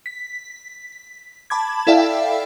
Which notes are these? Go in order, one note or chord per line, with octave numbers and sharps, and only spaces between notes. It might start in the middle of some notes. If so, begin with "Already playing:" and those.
B6
A5 B5 D6 G#6
E4 A4 D5 E5 F5 G5